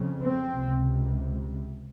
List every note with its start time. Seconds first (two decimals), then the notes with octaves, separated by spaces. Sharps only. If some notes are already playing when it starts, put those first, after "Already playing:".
Already playing: F2 C#3
0.21 C4
0.53 C#2 C3